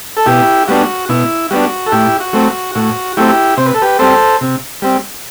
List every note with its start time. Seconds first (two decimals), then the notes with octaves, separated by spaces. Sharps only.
0.17 A4
0.26 B2 E4 G4
0.68 G3 B3 D4 F#4
1.09 B2 E4
1.51 G3 B3 D4 F#4
1.86 A4
1.92 A2 E4 G4
2.20 F#4
2.33 F#3 A3 C4
2.47 F#4
2.75 A2 F#4
3.17 F#3 A3 C4 E4 G4
3.57 C3 C5
3.66 B4
3.74 A4
3.82 G4 B4
3.99 G3 C4 A4 C5
4.41 C3
4.82 G3 C4